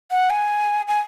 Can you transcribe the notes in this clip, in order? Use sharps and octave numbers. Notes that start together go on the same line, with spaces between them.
F#5
G#5
G#5